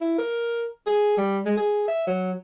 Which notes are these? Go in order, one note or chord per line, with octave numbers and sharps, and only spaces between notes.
E4
A#4
G#4
G3
G#3
G#4
E5
F#3